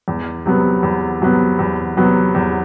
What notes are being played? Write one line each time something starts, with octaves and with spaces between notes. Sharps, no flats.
E2
C3 F#3 B3
E2
C3 F#3 B3
E2
C3 F#3 B3
E2